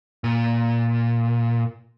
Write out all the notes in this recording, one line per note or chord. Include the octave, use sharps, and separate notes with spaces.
A#2